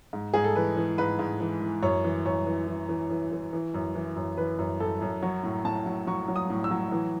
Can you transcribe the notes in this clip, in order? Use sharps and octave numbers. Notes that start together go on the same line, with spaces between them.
G#2
G#2 G#4
A4
E3 B4
E3
G#2 B4
G#2
E3
E3
F#2 C#5
E3
F#2 C#5
E3
E3
E3
E3
E3
E3
F#2
E3
F#2
E3 B4
F#2
F#2 A4
F#2
F#3 C#5
A2
A2 A5
F#3
F#3 C#6
F#3
D#6
A2
E6
F#3
E3